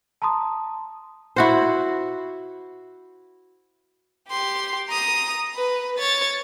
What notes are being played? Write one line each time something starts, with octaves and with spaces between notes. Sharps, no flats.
A5 A#5 C6 D#6
E4 F#4 C5
G4 C6
A#5 D#6
B4
C#5 A6